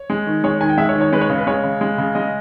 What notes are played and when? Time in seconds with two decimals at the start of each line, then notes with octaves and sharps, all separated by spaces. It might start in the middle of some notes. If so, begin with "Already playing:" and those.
Already playing: C#5
0.10 G#3
0.27 D#3
0.44 G#3 C#5
0.61 D#3 G#5
0.69 G5
0.78 G#3 E5
0.89 C#5
0.95 D#3
1.01 C#5
1.12 G#3 B4
1.21 C#5
1.30 C#3
1.38 B4
1.47 G#3 C#5
1.64 C#3
1.81 G#3
1.98 C#3
2.15 G#3 D#5